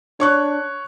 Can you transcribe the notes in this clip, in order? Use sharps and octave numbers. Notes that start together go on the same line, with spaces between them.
D4 C#5 C#6 F#6